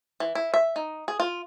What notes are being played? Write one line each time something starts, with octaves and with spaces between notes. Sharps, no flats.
E3
E4
E5
D#4
G#4
F4